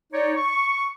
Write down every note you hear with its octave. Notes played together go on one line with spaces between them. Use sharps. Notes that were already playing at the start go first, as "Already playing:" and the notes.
D#4 C#5 D5
C#6